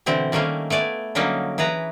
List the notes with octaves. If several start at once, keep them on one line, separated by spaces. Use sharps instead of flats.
B2 D3 E3 C4
D#3 G3 A3 A#3 C#4 F5
A3 B3 D5 G#5
D3 F#3 G3 A#3 C#4 D#4
E3 G#4 B4 A#5